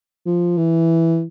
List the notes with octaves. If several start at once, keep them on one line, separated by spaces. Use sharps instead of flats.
F3
E3